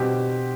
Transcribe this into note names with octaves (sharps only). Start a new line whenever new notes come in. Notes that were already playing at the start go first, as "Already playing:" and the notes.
Already playing: B2 G3 C4 F#4 G4